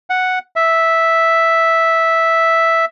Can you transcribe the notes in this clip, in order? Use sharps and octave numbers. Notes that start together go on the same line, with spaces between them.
F#5
E5